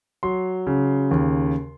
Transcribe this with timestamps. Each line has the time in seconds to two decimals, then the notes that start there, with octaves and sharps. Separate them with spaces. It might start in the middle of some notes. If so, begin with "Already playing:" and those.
0.23 F#3 C6
0.67 C#3
1.11 D#2